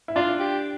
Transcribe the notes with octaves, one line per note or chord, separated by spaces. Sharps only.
E4
D4 F4
G4